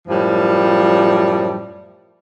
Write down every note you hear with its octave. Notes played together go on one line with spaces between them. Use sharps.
F#2 A2 F3 G3